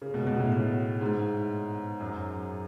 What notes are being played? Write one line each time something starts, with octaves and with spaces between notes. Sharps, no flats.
C#3
B2
B2
A2
B2
G#2
F#2